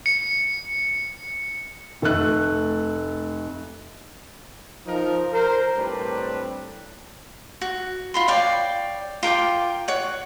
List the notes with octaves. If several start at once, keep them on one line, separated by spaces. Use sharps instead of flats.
C#7
F1 A3 A4 F#6
F3 D#4 A#4
A#4 C5
A2 G3 C4 D4 B4
F#4
F4 B5 C6
C#5 D5 F5 G5
F4 A#4 G5 D6
C#5 F#5